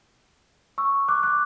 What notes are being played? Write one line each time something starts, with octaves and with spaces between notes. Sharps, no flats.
C#6 E6
D6 F#6
D6 F#6